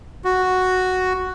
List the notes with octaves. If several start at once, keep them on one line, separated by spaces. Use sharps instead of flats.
F#4